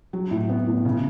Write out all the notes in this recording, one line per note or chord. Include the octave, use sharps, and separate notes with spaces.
F#3
A2
B3
A2
C#3